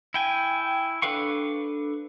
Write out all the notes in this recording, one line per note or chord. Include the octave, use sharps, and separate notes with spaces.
E4 G5 G#5
D4 A4 B4 F5 C#6